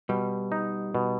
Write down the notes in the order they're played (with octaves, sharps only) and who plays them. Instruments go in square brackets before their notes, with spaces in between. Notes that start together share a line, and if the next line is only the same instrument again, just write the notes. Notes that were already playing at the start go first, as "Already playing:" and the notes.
[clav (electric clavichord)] B2 [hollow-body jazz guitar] G3
[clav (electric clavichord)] D#4
B2